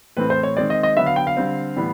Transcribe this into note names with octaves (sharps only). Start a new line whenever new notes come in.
A2 E3 A3 C4 B4
C5
C#5
D#3 G#3 C4 D5
D#5
D#5
D3 F#3 B3 E5
F5
G5
F5
D3 G3 C4
A2 E3 G3 B3